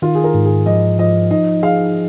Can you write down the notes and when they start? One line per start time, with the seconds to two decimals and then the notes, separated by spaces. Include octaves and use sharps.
0.02 D#3 F4
0.15 G#4
0.24 A#4
0.34 G#2
0.45 G#4
0.66 F3 D#5
0.99 F3 D#5
1.31 D#4 D#5
1.63 G#4 F5